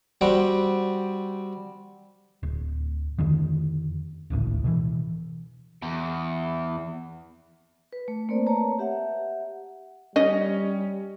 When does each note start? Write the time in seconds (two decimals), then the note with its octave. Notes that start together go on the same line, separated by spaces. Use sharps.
0.21 G3 C4 F#4 G5
2.43 D1
3.18 F2 D3 D#3
4.30 D1 G#1 C#2 A2
4.64 B2 D#3 E3
5.82 E2
7.93 B4
8.08 A3
8.29 A3 A#3 C4 A#4 C5 D5
8.47 B4 C#5 A5 A#5
8.79 G4 E5 F#5
10.16 G3 C#4 D#5